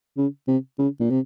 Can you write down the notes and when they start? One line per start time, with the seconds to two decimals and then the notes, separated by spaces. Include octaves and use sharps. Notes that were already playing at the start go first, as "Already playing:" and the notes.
0.17 C#3
0.47 C3
0.79 C#3
1.00 A#2
1.10 C3